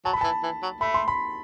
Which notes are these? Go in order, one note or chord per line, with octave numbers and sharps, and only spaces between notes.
F#3 A5
B5
E3 A5
E3
F#3
A3 B5
C6
B5